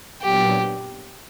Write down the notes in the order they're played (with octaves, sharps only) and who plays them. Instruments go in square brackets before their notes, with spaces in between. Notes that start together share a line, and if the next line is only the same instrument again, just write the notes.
[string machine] A#2 F#3 B3 D4 [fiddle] G4